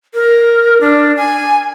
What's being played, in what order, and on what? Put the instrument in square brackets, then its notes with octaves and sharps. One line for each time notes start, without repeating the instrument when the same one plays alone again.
[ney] A#4
D4
G#5